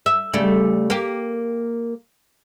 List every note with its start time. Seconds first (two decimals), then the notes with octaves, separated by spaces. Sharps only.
0.06 E5
0.33 C#3 G3 A3
0.90 A#3 G4